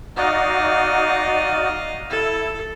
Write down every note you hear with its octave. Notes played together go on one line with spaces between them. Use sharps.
D#4 F#4 D5 D#5 F5
E4 A4